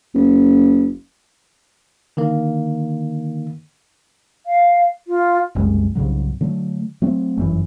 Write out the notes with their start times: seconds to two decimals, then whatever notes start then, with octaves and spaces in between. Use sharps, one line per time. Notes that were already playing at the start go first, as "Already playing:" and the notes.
0.15 F#1
2.17 D3 D#3 A#3
4.46 F5
5.08 F4
5.55 F#1 C2 F#2 G#3
5.95 C2 G#2 C#3 F#3
6.41 D3 F#3 A3
7.02 F#3 A3 C4
7.37 G1 F#2 E3